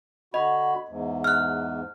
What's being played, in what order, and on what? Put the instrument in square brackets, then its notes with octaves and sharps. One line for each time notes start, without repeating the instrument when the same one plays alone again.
[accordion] D3 F#4 B5 [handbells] D#5
[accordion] E2 G#2
[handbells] F6 F#6